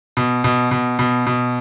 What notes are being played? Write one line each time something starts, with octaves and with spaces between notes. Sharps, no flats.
B2
B2
B2
B2
B2